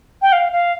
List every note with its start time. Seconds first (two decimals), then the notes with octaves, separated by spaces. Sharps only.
0.22 G5
0.33 F5
0.52 F5